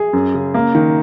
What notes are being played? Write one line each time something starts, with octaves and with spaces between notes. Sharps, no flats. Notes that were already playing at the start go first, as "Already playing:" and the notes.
Already playing: G#4
F#2
C#3
A#3
D#3